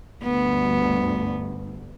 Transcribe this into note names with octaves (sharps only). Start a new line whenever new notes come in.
D2 G2 B3